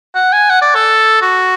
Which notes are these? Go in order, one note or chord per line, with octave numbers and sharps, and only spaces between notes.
F#5
G#5
F#5
D5
A4
F#4